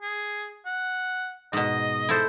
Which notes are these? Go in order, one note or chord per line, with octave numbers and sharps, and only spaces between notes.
G#4
F#5
G#2 B2 D#5
E4 A4 C5